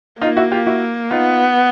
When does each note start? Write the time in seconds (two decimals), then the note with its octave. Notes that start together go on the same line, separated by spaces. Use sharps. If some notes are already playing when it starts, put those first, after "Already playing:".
0.21 A#3 D#4 F4
0.36 E4 F#4
0.51 F4 G4
0.66 E4 F#4
1.11 B3 D#4 F4